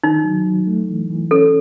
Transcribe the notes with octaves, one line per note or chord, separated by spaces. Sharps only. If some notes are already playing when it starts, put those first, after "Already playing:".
D#3 D#4
F#3
F#3
A3
E3
E3
C#4 A4